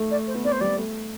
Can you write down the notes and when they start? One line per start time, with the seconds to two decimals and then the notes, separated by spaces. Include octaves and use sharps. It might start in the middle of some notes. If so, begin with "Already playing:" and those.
Already playing: A3
0.11 D5
0.27 C5
0.34 B3
0.44 C4 D5
0.52 C5
0.60 G3 D5
0.77 A3